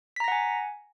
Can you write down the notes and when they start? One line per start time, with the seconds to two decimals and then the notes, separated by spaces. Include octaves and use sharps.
0.16 B6
0.20 A#5
0.24 A#6
0.28 F#5
0.32 G#5